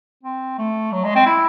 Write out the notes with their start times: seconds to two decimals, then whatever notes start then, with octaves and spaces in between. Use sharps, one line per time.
0.23 C4
0.58 A3
0.92 F#3
1.04 G#3
1.15 C4
1.26 E4